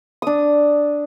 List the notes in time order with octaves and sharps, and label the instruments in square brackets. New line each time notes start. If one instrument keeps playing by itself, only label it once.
[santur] D4 D#6